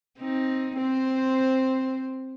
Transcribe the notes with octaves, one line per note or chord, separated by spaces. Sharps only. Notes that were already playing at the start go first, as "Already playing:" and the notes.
C4 D#4
C4 C5